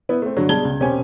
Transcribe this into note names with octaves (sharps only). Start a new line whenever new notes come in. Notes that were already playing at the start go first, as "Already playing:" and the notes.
B3 E4 B4
A3 C4
G2 D3 F#3
B2 G3 G#3 A5 G#6 G7
C#2
E1 C3 C#4 G4 C5 G#5